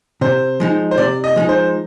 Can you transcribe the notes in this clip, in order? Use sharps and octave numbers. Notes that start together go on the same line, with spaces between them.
C3 C5
F3 G#3 D#4
C5
C3 D5
D#5
F3 G#3 D#4
C5